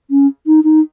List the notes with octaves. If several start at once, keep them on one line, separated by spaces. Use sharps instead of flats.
C#4
D#4
D#4